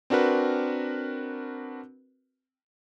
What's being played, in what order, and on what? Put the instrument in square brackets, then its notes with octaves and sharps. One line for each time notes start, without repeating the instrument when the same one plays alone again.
[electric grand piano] C4 D4 F#4 A#4 B4